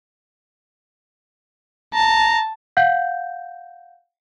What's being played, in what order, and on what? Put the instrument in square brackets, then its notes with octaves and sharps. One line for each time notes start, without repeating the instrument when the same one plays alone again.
[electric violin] A5 [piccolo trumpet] A#5
[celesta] F5 F#5 G6